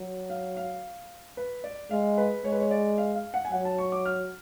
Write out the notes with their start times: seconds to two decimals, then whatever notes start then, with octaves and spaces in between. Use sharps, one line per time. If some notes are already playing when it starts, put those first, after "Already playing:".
Already playing: F#3
0.30 F5
0.57 F5
1.37 B4
1.64 D5
1.91 G#3 F5
2.18 B4
2.44 G#3 C#5
2.52 B4
2.60 C#5
2.71 D5
2.98 F5
3.15 F5
3.34 F#5
3.45 G#5
3.51 F#3 F#5
3.65 A5
3.78 C#6
3.92 D6
4.05 F6